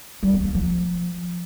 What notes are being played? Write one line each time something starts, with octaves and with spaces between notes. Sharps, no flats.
G3
B3
A#3
F3